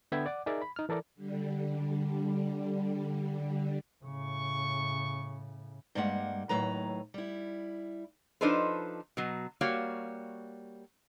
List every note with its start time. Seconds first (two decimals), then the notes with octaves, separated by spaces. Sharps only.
0.12 D3 B3 E5 G5 B5 G#6
0.26 D5 F#5 D6
0.46 D#4 G#4 A#4 D5 E5
0.62 B5
0.76 D#4 F6
0.89 E3 A4 A#4 D5
1.16 D3 G3
4.04 A2 C#3 C#6
5.95 G2 G3 G#3 A#3 F#5
6.49 D#2 A2 F#3 B4 A#5
7.14 G3 E4
8.41 F3 D4 D#4 A4 B4 C5
9.17 B2 F#3
9.61 G3 A#3 F#4 C#5 F5